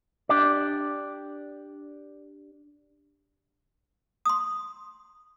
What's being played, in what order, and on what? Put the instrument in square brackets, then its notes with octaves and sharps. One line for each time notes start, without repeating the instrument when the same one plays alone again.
[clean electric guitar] D4 G4 D5
[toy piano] C6 D#6